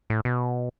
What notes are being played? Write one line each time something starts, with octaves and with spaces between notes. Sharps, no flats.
A2
B2